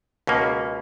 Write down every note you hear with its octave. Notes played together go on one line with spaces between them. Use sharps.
C#2 B2 A#3 C#4